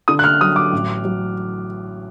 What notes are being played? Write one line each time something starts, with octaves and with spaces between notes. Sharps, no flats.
D3 D#6
F#6
F6
F#3 D#6
D6
A1
F#3